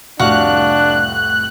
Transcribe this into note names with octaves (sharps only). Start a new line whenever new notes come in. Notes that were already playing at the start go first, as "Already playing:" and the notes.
F1 C2 A2 D4 F#4 F5 F#6